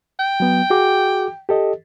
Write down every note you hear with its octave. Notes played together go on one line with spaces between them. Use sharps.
G5
F#3 B3
F#4 G#4 D6
G4 A4 D#5